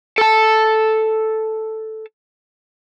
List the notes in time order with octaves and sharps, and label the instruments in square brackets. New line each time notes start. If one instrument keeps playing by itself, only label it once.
[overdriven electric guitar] A4 A5